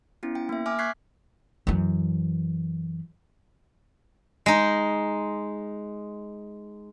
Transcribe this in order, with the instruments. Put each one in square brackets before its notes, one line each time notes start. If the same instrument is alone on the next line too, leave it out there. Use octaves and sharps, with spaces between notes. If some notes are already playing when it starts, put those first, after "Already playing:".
[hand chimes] B3 C#4 E4
G5
A#3 E5
E5 G#5 D6 F6
C#6 F#6 G#6 B6 C7
[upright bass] F#2 E3
[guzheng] G#3 D#4